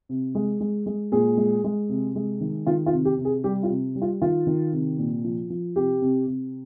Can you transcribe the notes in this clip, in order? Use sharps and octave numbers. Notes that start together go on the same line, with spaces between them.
C3
G#3
G#3
G#3
A#2 G#4
G#3
G#3
C3
G#3
D#3
D#3 F4
F4
C3
G4
C3
G#4
G3 G4
F4
C3
G3
F4
D#3 F4
D#3
C3
A#2
F3
F3
C3 G4
C3
C3